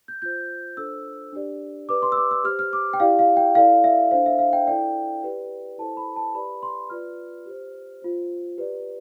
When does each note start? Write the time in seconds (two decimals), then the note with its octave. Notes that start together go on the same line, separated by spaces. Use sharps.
0.08 G6
0.22 F4 C5 G6
0.77 D4 A4 C5 E6
1.33 D4 G4 D5
1.89 G4 B4 D5 D6
2.02 C6
2.12 E6
2.17 D6
2.31 E6
2.44 G4 F6
2.48 C5
2.59 F6
2.73 D6
2.93 G5
3.00 E4 G4 D5 F5
3.19 F5
3.37 G5
3.55 E4 A4 D5 F5
3.84 E5
4.11 D4 A4 C5 F5
4.26 E5
4.39 F5
4.53 G5
4.67 E4 A4 D5 G5
5.23 G4 B4 D5
5.78 E4 A4 C5 A5
5.97 B5
6.16 A5
6.35 G4 B4 D5 B5
6.63 C6
6.90 F4 B4 D5 F6
7.46 G4 C5
8.02 F4 C5
8.58 G4 B4 D5